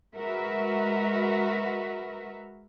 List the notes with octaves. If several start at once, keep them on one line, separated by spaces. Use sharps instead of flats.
G#3 F#4 A#4 B4 E5